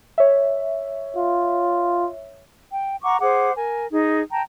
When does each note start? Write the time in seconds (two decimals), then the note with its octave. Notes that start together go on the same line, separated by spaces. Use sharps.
0.18 C#5 E5
1.17 F4
2.72 G5
3.03 F#5 A#5 C#6 D6
3.21 G#4 C5 F#5 D6
3.55 A#4 G#5
3.92 D#4 G#4
4.31 G5 A5 A#5